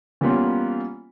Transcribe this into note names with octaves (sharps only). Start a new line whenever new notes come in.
E3 G3 A#3 B3 C#4 F4